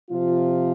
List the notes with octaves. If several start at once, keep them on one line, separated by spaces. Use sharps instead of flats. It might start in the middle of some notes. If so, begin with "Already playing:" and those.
C3 F3 F4